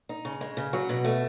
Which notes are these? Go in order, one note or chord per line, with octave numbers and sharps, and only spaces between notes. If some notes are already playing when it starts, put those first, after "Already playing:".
D#4
C#3
G#3
C#3
F#3
B2
A3